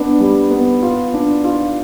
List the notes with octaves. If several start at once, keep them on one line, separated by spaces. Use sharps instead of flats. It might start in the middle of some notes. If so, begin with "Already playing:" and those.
Already playing: B3 D4
G3
B3
F4
D4
F4